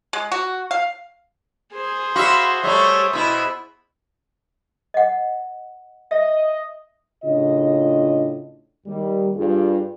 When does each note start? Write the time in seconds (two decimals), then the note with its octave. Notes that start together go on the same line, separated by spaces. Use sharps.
0.13 G#3
0.32 F#4
0.71 F5
1.73 G#4 C5
2.16 F#4 E5 F5 B5 C6
2.63 G3 A3 C#5 E5
3.13 B2 E4 B5
4.94 D#5 F#5
6.11 D#5 E5
7.24 A2 C#3 D4 F4 D#5
8.86 D#2 D#3 G3
9.36 G2 G3 F4 G#4